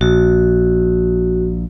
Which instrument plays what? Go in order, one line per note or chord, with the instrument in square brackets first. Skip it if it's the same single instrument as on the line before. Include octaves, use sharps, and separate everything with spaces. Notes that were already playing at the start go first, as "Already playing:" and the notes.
[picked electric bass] A#1 [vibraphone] F#4